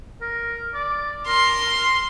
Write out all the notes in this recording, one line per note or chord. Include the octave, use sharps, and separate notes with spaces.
A#4
D5
A#4 C6